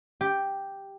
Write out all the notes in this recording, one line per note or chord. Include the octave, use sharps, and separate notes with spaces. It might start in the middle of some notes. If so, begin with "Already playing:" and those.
G4